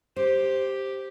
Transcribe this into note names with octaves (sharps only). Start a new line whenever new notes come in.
G4 C5